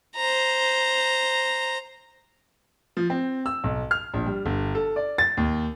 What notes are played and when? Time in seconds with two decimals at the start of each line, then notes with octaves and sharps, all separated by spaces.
0.16 C5 A#5
2.97 F3
3.10 C4
3.46 E6
3.64 B1
3.91 F6
4.14 A#1
4.26 G3
4.46 G1
4.75 A4
4.96 D5
5.18 A6
5.37 D#2